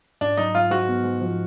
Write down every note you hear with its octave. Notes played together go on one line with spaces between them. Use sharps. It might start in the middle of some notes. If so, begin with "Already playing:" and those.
G#2 D4
F#3 D#4
G#2 F4
G#2 F#4
B3
G#2
F3